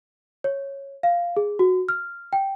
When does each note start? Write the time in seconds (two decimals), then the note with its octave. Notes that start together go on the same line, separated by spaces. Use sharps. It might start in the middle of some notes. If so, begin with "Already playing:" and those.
0.44 C#5
1.03 F5
1.37 G#4
1.59 F#4
1.89 F6
2.33 G5